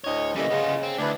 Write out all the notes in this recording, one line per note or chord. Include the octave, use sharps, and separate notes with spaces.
D2 A2 C#5 D#5
C#3 E3 G3 A3 A#3 D#5
C#3 B3 F4
C4
D2 D4 E4 B4